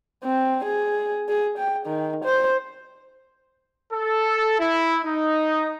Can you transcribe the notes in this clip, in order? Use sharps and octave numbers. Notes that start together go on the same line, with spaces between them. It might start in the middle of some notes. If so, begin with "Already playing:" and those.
C4
G#4
G#4
G5
D#3
C5
A4
E4
D#4